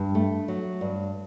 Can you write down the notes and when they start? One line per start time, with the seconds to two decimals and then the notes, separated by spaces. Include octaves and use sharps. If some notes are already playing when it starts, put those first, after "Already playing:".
Already playing: G2
0.15 A3
0.48 F#3
0.81 G2